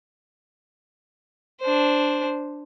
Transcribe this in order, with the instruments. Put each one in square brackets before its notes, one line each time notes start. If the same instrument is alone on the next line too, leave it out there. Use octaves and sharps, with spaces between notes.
[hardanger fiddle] D4 C5